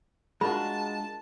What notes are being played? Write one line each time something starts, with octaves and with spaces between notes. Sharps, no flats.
G#3 D4 F4 F#4 A#4 A5 B5